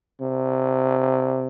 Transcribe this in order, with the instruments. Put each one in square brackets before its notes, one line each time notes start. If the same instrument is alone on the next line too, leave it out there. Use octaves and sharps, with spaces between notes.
[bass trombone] C3